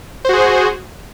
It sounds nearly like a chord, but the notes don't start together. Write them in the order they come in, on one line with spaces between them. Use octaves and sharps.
C5 F#4 G#4